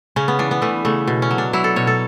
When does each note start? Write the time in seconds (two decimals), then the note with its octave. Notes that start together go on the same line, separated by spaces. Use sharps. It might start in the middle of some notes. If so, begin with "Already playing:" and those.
0.16 C#3 C#4
0.28 B3
0.39 E3 D4
0.51 B3
0.62 E3 A3
0.85 C#3 A3
1.08 B2
1.22 C#4
1.31 F#3
1.38 D4
1.53 F#3 E4
1.64 A4
1.76 B2 C#5
1.87 A4